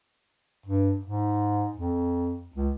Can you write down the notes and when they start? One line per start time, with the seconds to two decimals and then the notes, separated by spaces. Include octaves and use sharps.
0.66 G2
1.04 G#2
1.77 F2
2.56 C#2